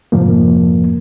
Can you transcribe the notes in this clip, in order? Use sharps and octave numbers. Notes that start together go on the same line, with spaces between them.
F2 G#2 C3 F3 A#3